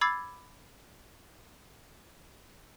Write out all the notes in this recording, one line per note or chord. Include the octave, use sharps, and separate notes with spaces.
B5 D6 E6 G#6 A6 C7